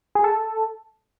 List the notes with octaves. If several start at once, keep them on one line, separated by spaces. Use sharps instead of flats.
G#4
A4